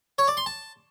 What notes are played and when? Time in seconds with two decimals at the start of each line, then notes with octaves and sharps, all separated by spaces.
0.18 C#5
0.28 D5
0.37 C6
0.46 A5